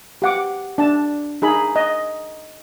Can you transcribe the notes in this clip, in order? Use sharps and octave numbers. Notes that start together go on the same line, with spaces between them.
G4 F#5 D6
D4 A5
D#4 G#4 B5
D#5